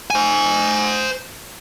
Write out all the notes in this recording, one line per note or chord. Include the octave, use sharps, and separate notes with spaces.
C5 G#5